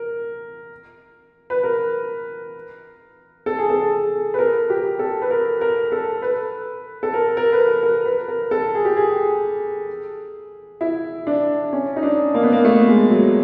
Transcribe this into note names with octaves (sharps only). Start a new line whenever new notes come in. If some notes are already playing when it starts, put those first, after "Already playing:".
Already playing: A#4
B4
A#4
A4
G#4
A4
B4
A#4
G4
A4
B4
A#4
A#4
A4
B4
A4
A#4
A#4
B4
A#4
A#4
B4
A#4
A4
G#4
G4
G#4
E4
D4
C#4
D#4
D4
A#3
B3
A#3
A3
G#3
F#3